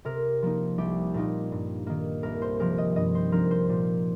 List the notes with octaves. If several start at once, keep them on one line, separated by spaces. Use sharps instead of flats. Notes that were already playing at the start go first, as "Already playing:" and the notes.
C3 A#4
F3 A#3 D#4
C2 G4
A#2 A#3 D#4
G2
D#3 A#3
C2 A#4
C5
C3 F3 A#4
D#5
G2 D#5
C5
F3 C4 D#4 A#4
C5
A#2